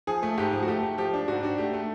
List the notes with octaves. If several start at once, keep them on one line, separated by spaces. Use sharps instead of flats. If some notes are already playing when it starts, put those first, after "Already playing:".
F3 G#4
A3
G#2 G4
F3
F#4
A3 G4
A3
F3 G4
D4
G#2 F#4
D4 F#4
A3 G4
A3